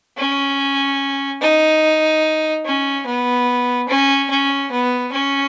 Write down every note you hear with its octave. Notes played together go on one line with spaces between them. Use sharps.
C#4
D#4
C#4
B3
C#4
C#4
B3
C#4